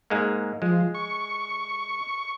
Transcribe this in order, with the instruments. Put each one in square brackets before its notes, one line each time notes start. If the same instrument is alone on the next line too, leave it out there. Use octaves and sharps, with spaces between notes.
[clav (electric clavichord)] G#2 G#3 A#3
[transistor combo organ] F3 [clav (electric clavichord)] G#3
[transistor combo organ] C#6